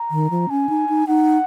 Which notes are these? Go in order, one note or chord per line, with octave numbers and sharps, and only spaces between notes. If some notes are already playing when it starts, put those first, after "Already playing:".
Already playing: A#5
D#3
F3
C#4 G#5
D#4
D#4
D#4 F#5